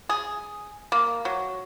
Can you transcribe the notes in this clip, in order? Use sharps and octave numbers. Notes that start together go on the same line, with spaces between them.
G#4
A#3
F#3